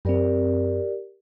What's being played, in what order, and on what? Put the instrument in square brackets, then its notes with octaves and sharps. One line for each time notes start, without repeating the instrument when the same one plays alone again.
[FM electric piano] F#2 C4 [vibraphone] G4 A#4 D5